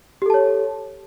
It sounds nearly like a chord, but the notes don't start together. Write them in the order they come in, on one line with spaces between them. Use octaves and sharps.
G4 A4 A5 C#5